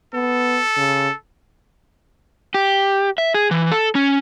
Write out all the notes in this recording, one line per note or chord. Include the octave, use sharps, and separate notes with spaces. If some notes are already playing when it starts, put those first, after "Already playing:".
B3 A4
C#3
G4
E5
G#4
E3
A4
C#4